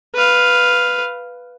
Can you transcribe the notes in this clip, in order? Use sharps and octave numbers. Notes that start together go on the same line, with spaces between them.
B4 F5